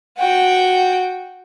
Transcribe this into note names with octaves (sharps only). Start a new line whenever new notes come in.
F#4 G5